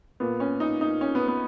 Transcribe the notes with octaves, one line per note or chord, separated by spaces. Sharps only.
A#2 B3
C#4
D#4
D#4
C#4
B3
B3